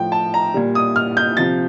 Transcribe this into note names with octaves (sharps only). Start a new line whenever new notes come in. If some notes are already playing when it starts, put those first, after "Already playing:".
Already playing: A2 F3 G5
A5
A#5
A#2 G3
D#6
F6
G6
C3 F3 A6